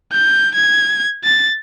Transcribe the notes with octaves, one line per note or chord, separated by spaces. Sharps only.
G6
G#6
A6